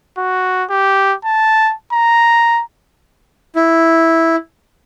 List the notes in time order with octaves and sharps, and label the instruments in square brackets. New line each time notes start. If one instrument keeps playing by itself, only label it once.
[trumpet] F#4
G4
A5
A#5
[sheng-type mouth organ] E4